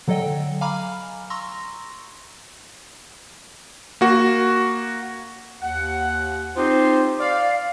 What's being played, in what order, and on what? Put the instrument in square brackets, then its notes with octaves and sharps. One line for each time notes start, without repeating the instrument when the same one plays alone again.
[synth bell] D3 F#3 A4 D#5 G5
F5 G#5 A#5 B5 D6 F6
A#5 C6 C#6 E6 A#6
[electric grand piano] A#3 F#4
[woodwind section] D#2 F#5
C4 D#4 F4 G4 C5
D5 F5